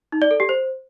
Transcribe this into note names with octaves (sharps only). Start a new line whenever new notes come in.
D#4
D5
A4
G4
C5